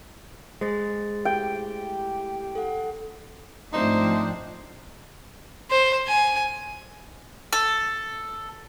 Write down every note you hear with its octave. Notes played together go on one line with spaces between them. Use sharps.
G#3 G#4 C5 A6
A3 E4 G4 G5
A4 F#5
G#2 F3 A3 C4 D4 D#4 C5
C5
G#5
A4